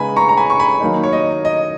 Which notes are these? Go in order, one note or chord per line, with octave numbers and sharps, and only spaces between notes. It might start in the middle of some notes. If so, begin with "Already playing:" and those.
Already playing: C#3 G#3 B3 D#4 G#5 B5
A#5 C#6
A#5
G#5 B5
C#6
G#5 B5
D#3 F#3 A#3 D#4
C#5
D#5
D#5